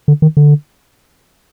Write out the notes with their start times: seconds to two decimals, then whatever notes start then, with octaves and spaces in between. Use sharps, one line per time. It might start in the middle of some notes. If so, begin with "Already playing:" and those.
0.08 D3
0.22 D#3
0.37 D3